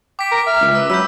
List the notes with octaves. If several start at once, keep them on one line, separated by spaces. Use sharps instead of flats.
G5 D6 B6
A#4
E5 F6
C#2
B4 E6
F#3 B5 E6 G6